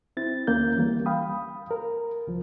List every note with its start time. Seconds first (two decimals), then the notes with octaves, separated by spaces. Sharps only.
0.17 C4 E4 A6
0.47 D2 A#3 C#4 G6
0.77 E3 G3 A#3
1.06 F5 G5 B5 D#6
1.71 A#4
2.27 C2 F3